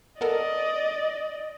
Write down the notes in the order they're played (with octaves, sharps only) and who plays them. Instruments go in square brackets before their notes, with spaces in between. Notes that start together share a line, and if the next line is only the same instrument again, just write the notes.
[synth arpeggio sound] B3 A4 A#4 [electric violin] D5 D#5